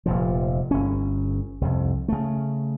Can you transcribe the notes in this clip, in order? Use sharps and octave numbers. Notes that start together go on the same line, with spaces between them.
F1 A#2 F3
G1 C#4
C2 F2
C#3 A3